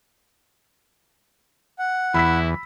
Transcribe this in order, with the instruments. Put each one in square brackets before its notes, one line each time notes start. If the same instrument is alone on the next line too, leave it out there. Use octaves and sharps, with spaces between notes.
[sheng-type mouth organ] F#5
[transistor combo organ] E2 [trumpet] E4 [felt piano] B5 E6 B6